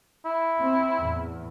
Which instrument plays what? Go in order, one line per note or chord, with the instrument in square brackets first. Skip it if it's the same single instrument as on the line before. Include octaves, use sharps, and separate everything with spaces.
[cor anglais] E4
[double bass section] C4
E2 A2